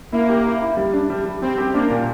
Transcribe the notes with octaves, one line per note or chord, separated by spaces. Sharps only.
A#3 E4
G4
E4
E4
G3
D4
G3
G3
G3 C4
G4
A#3 D4
A#2